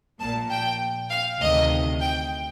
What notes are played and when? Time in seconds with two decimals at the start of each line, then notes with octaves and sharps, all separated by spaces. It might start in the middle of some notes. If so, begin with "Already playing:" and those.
0.19 A#1 A#2 A5
0.50 G5
1.10 F5
1.40 D2 C3 D#3 D#5
2.01 G5